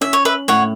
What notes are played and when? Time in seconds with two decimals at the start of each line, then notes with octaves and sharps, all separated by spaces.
0.01 C#4 E5
0.13 C#5
0.25 B4 E5
0.48 A2 C#5 F#5